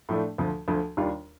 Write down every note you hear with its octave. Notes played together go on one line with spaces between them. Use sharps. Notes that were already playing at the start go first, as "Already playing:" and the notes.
A2 F3 A3 D4
D2 D3 F3
D2 D3 F3
D#2 D#3 G3 D4 F4